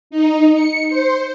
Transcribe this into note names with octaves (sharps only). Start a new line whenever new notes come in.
D#4
C#7
C5